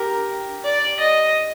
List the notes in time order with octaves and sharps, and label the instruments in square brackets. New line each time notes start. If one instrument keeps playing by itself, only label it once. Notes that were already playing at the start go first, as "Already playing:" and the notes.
Already playing: [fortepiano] G4 [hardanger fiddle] A#4
[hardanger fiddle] D5
D#5